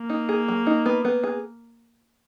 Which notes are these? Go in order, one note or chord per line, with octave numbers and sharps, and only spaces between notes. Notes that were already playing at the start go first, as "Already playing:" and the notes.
Already playing: A#3
D#4
G#4
F#3
D#4
B3
B3
G#4